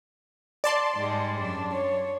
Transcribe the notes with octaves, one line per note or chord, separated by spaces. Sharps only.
D5 A5 C6
G#2 G3 G#3
F#2 D4
C#5